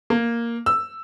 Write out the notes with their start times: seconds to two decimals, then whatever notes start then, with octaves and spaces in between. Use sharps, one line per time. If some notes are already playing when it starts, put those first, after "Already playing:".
0.10 A#3
0.66 E6